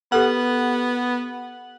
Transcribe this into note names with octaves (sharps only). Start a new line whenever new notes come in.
B3 G4 A4 B4 F#5